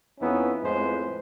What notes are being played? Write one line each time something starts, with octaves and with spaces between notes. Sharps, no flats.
F2 B3 C#4 D#4 E4
F2 A2 G#3 B4 C5